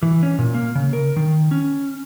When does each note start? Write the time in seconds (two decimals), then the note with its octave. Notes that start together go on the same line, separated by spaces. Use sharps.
0.03 E3
0.23 C#4
0.39 A#2
0.55 A#3
0.75 C#3
0.93 A#4
1.16 D#3
1.51 C#4